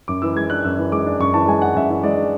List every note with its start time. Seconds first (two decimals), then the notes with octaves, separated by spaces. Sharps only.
0.08 F#2 D6
0.22 E3 E6
0.36 G#3 G#6
0.50 D4 F#6
0.64 F#2 E6
0.79 E3
0.92 G#3 D6
1.06 D4
1.20 F#2 C#6
1.34 E3 A5
1.47 G#3 G#5
1.62 D4 F#5
1.75 F#2 E5
1.89 E3
2.03 G#3 D5
2.18 D4